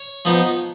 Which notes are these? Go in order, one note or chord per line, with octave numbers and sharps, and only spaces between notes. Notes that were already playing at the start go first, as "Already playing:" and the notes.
Already playing: C#5
F3 B3 D#4